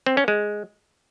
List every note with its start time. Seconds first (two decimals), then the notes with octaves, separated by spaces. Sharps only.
0.06 C4
0.17 C#4
0.28 G#3